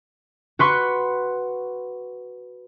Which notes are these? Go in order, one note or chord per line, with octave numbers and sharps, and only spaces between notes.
F#4 B4 C6 C#6 F#6